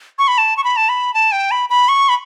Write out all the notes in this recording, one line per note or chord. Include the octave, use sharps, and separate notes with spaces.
C#6
B5
A5
C#6
B5
A5
B5
A5
G5
B5
B5
C#6
B5